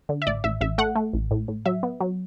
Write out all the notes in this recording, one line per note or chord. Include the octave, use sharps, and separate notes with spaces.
D3
E5
A1 D5
A1 E5
A1 E5
A3 F#5
A3
A1
A2
A2
F#3 E5
B3
F#3